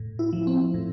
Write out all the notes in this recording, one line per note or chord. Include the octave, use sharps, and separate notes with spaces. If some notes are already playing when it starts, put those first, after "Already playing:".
Already playing: A2
E4
F3
C4
A2